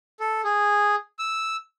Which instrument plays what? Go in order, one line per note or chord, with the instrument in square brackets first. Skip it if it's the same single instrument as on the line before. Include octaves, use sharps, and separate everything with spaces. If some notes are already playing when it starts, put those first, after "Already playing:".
[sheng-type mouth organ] A4
G#4
E6